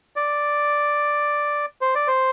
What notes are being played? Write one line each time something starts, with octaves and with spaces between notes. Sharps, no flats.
D5
C5
D5
C5